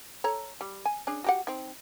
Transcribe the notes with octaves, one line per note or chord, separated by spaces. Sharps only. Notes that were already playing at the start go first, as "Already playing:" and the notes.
A4 C#5 A#5
G3
G#5
C#4 D4 G#4
F#4 G4 F#5
C4 D#4